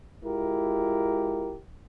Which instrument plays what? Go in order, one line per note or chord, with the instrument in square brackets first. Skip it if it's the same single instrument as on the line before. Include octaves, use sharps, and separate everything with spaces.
[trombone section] G#3 E4 F4 G4 A#4